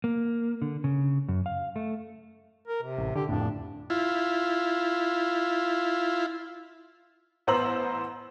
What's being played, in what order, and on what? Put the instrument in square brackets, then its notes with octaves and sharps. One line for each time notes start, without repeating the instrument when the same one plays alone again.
[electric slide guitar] A#3
D3
C#3
F#2
F5
A3
[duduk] A#4
C3
[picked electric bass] A1
[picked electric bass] D3 [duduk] G4
[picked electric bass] F2 A2 [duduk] D4
[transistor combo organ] E4 F4
[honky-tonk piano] A1 B3 C5 A#5 E6 F#7